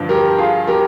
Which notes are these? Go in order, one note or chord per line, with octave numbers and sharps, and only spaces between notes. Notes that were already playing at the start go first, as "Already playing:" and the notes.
Already playing: G2 D3 F3
G4 A#4
F4 G#4
G4 A#4